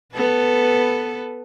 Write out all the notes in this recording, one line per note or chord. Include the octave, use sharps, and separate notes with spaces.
B3 A4 B4